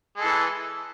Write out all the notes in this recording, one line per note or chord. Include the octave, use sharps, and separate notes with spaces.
E3 G#3 A4